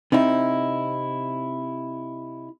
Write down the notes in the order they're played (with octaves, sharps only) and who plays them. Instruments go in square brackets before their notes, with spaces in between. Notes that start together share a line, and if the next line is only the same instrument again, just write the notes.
[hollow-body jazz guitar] C3 C4 D#4 E4